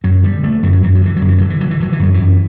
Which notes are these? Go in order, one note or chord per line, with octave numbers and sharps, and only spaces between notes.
F#2 F#3
D3 G3
D3 A3
F#2 E3
F#3
F#2 E3
F#3
D3 E3
F#3
F#2
E3
D3 F#3
E3
D3 F#3
E3
D3 F#3
E3
F#2 F#3
F#2 E3